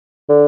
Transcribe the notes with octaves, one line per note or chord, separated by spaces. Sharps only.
D3